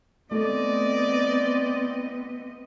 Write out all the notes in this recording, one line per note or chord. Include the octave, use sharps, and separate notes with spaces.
A3 B3 C4 D5 D#5